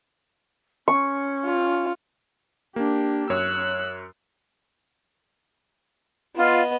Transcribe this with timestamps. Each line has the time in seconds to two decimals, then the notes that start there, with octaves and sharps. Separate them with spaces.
0.88 C#4 C#6
1.46 F4
2.76 A#3 D4 G4
3.30 F#2 C#5 E6 F#6
6.36 B3 F4 D#5